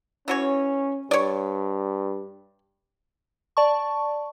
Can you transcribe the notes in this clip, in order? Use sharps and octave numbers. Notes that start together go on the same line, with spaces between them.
E3 C#4 F#4 C#5
G2 C#5 D5
D5 A5 C#6